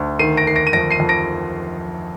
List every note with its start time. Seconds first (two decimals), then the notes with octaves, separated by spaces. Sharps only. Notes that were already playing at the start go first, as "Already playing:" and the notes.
Already playing: D2 D3
0.19 D#3 C7 D#7
0.37 A#6 D7
0.46 D#3 C7
0.56 A#6 D7
0.67 D#7
0.73 F2 A#6 D7
0.91 C7 D#7
1.00 F2
1.09 A#6 D7